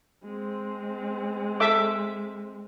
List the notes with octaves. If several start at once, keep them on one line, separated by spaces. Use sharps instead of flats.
G#3 C4
A4 E5 D6